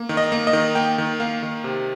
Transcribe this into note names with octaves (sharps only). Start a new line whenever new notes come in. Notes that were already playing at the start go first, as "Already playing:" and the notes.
Already playing: A#3
D#3
D#5
A#3
D#5
D#3
A#3 G5
D#3
A#3 F5
D#3
C3